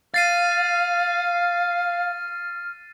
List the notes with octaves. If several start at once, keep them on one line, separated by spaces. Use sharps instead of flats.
F5 F6 A6 C7 D#7